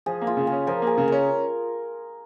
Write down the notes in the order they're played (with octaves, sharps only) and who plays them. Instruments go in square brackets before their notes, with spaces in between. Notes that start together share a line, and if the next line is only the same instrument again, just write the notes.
[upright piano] F3 [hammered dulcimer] G#4
[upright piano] A#3
[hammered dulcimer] F4
[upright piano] C#3
[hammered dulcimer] G#4
[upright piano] C#4
[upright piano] F3 [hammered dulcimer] A#4
[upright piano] A#3 [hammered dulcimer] G#4
[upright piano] C#3
[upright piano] C#4 [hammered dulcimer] A#4